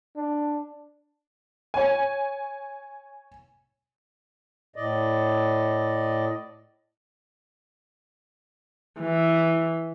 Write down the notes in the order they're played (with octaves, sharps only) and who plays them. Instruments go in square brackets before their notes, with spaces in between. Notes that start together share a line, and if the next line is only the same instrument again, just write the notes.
[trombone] D4
[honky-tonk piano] C#5 G#5
[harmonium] A2 D5 D#5
[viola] E3